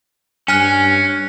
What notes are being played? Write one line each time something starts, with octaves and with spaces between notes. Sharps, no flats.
G2 C#4 G#5 F6 F#6